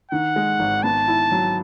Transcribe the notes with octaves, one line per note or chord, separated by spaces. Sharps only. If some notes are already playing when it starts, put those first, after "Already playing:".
D#3 F#5
G#3
G#1
B3 A5
E4
F#3